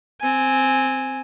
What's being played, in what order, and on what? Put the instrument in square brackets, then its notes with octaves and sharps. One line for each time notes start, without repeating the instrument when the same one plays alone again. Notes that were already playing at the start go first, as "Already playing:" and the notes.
[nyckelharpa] C4 G#5